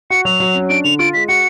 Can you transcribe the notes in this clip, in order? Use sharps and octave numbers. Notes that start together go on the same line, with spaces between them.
F#4 C#7
F#3 F7
F#3
C#4
D4 D7
D3 F7
F4 D7
G#3 B6
F#4 C#7